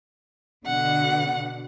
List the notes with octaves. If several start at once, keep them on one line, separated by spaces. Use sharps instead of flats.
B2 D3 F#5